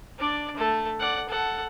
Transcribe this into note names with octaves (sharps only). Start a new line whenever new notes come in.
D4 D5
A3 A4
D5 F#5
A4 F#5